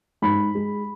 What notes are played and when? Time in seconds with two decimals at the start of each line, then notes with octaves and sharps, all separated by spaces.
0.22 G#2 B5
0.55 G#3